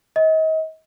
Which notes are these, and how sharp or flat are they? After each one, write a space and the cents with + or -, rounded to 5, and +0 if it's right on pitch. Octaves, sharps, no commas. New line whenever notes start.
D#5 +35